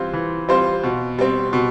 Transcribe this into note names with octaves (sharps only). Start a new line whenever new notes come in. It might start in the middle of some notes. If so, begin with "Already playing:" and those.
Already playing: E3 G3 C4 F4 C5
E3
G3 C4 F4 C5
B2
G3 C4
B2